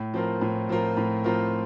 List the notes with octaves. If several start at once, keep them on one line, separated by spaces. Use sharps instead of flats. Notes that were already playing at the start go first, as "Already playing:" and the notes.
Already playing: A2
F3 C4 F4 A#4
A2
F3 C4 F4 A#4
A2
F3 C4 F4 A#4